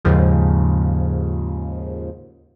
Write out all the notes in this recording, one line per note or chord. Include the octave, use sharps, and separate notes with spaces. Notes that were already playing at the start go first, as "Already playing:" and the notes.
D#2 G#2 C#3 F3